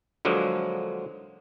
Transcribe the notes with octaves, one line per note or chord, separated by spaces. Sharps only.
D3 F3 F#3 G#3 A#3